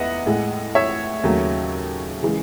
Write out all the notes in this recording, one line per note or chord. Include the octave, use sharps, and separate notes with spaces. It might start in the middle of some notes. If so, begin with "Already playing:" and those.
Already playing: E2 B4 D#5 E5 F#5
A2 G#3
C#5 E5
D#2 C#3 F#3 A3
C#3 E3 G#3